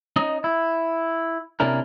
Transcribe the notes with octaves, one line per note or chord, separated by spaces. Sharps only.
C#4 D#4 D#5
E4
C3 A#3 C#4 D4 E4 A#4